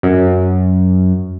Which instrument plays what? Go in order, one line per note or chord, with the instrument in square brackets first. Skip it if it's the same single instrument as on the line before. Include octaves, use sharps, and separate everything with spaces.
[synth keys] F#2